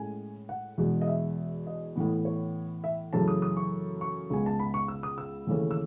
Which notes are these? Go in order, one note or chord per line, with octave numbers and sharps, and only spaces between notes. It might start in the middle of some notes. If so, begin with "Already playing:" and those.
Already playing: A2 G#3 C#4 G#5
F#5
E2 B2 G#3
D#5
E5
D#5
A2 E3 B3
C#5
E5
F#2 C#3 E3 A3 C#4 A5
D#6
D#6
C#6
C#6
C#2 C#3 G#3 B3 G#5
A5
B5
C#6
E6
D#6
E6
D#2 C#3 E3 A3 C#4
E6